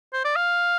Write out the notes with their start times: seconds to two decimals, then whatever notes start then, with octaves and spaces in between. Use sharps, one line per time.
0.13 C5
0.25 D5
0.36 F5